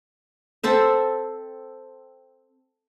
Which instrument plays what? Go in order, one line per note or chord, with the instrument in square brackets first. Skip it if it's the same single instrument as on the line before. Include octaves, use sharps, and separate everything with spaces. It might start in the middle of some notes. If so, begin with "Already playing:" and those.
[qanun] C4 A4 C5 E5